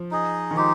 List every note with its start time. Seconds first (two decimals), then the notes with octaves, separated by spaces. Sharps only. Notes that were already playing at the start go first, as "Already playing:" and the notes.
Already playing: F3
0.11 D#4 G#4 D#5
0.51 D#3
0.56 F3 G#3 D#4 G4